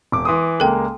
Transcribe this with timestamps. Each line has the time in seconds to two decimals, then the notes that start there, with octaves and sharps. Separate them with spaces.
0.12 E1 D6
0.25 E3 C6 D#6
0.60 C#2 G#3 A#3 A4 G5